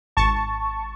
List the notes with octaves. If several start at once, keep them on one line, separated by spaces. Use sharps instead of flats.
G#1 A5 C#6